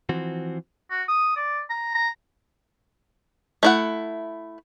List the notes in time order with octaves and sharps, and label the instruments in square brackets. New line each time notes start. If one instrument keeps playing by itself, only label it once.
[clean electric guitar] E3 F3 C4 F#4
[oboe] F#4
D#6
D5
A#5
A#5
[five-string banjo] A3 E4 F#5